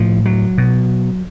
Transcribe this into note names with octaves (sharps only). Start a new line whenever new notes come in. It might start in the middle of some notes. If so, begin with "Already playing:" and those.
Already playing: A2 F3
F#3
B2